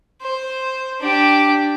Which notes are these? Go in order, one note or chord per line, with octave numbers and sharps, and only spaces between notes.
C5
D4 G4